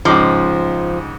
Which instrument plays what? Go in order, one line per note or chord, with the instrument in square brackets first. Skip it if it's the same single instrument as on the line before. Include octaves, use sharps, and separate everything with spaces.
[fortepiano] C#2 G#2 D6 [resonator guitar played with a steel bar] F3